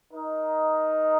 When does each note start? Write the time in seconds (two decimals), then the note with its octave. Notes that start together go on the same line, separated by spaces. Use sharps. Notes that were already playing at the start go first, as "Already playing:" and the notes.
0.12 D#4 A#4 D#5